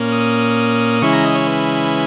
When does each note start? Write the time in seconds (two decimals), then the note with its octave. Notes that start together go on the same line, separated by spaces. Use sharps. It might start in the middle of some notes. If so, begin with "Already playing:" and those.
Already playing: A#2 A#3 C#4
0.12 D#6
1.01 C#3 E3 G#3 C#4 E4 C#6
1.13 A#5
1.24 D#5
1.35 C#5
1.47 B4